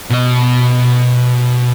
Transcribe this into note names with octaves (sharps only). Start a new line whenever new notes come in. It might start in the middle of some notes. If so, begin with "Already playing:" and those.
B2 D#5